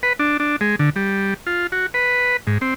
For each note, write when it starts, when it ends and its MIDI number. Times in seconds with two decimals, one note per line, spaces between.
0.03 0.13 71
0.19 0.37 62
0.40 0.56 62
0.61 0.76 56
0.79 0.90 50
0.96 1.34 55
1.47 1.67 65
1.72 1.86 66
1.94 2.37 71
2.47 2.58 44
2.61 2.74 60